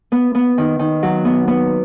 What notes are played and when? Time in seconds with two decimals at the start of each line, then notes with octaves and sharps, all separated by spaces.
0.12 B3
0.35 B3
0.58 D#3
0.79 D#3
1.03 F#3
1.25 B3
1.48 B3